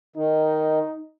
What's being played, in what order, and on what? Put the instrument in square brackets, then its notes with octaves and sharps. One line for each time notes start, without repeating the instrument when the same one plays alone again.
[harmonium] D#3 [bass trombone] D#4